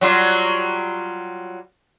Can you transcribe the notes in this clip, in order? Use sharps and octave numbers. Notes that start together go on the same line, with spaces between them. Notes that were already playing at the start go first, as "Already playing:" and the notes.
F#3 G3 F4